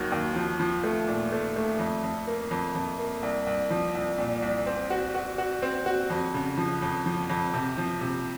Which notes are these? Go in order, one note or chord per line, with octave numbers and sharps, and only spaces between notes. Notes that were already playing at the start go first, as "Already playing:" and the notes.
Already playing: D#2 D#3 F#3
D#2
F3
F3
A3
A#2
A3
A3
F2
F2
A#3
F2
F2
A#3
C2
C2
F3
C2
A#2
C2
C4
F#4
F#4
F#4
C4
F#4
F2
C#3
F3
F2
F3
F2
C3
F3
C3